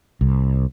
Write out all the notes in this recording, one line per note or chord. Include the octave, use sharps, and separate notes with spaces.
C2